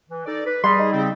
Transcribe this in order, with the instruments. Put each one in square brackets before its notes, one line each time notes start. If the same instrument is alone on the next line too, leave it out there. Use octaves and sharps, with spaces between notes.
[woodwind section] E3
D#4 A4 D5
B4
[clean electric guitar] G3 [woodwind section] G#4 [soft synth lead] C6
[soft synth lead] D#4
[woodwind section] C#3 C4